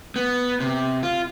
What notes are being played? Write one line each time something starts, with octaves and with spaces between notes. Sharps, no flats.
B3
C3
F4